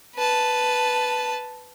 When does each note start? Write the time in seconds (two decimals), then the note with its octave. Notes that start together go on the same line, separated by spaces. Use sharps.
0.16 B4 A5